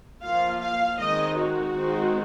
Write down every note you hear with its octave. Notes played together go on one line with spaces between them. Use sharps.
F3 A#3 F4 F5
F5
D#3 G#3 C4 D#4 D#5
F#4
D#3 G#3 C4 D#4